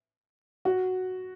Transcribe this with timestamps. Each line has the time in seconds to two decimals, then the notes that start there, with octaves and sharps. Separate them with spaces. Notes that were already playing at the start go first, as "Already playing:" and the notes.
0.65 F#4